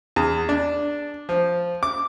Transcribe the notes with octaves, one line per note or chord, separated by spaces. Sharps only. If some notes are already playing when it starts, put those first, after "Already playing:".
E2
D4
F3
D6